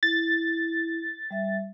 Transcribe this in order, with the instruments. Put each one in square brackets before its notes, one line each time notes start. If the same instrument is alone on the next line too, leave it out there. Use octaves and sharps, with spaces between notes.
[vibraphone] E4 [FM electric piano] A6
[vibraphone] G3 E5